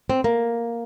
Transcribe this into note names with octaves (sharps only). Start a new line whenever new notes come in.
C4
A#3